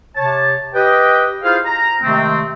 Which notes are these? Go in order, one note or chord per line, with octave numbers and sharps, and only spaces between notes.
C3 C#5 A5
G4 B4 D#5 G5
E4 F4 G#4 C5 F5
A#5
C3 D#3 G#3 A3 C4